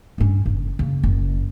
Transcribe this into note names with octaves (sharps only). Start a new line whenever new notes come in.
G2 C#4
F#1
C#3 A#3
F#1